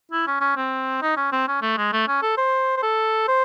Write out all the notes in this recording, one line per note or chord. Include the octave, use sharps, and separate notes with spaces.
E4
C#4
C#4
C4
D#4
C#4
C4
C#4
A3
G#3
A3
C#4
A4
C5
C5
A4
C5